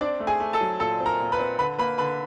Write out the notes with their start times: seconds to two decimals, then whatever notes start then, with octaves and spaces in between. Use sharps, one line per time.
0.01 C4 D4 D5
0.20 A3
0.27 G#4 G#5
0.40 A3
0.53 A4 A5
0.61 F#3
0.80 A#2 A4 A5
1.00 C4
1.06 A#4 A#5
1.20 A#2
1.32 B4 B5
1.39 C4
1.58 D3 B4 B5
1.79 A#3 B4 B5
1.98 D3 B4 B5